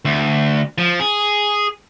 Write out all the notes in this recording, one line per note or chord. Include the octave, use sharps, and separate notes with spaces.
D2
F3
G#4